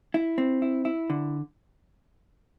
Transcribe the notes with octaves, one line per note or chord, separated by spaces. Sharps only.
E4
C4
E4
E4
D3